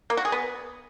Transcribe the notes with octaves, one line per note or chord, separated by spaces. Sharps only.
A#3
F#4
G#4
B3